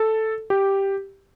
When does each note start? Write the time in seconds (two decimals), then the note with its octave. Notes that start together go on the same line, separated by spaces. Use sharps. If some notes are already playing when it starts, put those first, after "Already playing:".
Already playing: A4
0.50 G4